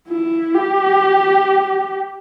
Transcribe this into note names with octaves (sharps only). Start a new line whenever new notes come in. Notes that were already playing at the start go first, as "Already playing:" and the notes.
E4
G4